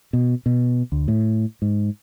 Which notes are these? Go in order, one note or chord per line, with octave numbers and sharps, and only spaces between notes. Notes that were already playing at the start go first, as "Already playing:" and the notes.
B2
B2
D2
A2
G#2